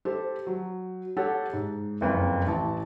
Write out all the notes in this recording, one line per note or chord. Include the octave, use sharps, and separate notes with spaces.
G4 A4 C5
F#3
G4 A4 C#5 F#5
G#2
F#1 F2 B4 F5
A1 A5